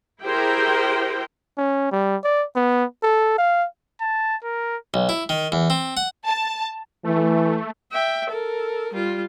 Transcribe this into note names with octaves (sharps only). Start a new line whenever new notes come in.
E4 G4 G#4 A#4 C5 G5
C#4
G3
D5
B3
A4
F5
A5
A#4
B1
E4
D#3
E2
C4
F#5
A5
E3 A3
E5 G5
A4 A#4
G3 F4